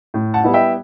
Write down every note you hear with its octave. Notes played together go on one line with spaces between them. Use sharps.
A2
F#5 A5
G3 B3 E4
E5 G5